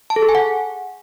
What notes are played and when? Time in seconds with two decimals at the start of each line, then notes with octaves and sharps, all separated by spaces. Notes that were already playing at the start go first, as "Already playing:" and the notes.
0.10 A5
0.16 A4
0.22 G#4
0.29 G#5
0.35 F#5